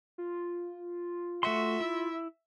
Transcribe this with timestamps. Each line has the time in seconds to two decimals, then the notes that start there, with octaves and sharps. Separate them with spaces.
0.18 F4
1.43 A3 F#4 E5 C6
1.80 E4